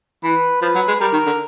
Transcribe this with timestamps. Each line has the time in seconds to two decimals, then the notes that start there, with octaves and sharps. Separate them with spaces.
0.23 E3 B4
0.62 F3 B4
0.75 F#3
0.88 G#3
1.00 G3 A#4
1.13 D#3
1.26 D3